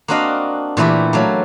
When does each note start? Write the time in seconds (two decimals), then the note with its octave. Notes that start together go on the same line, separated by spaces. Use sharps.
0.08 A#3 C4 D4 F#4 D#5 F5
0.77 A#2 E3 A3 E4 G4
1.13 F#3 A3 A#3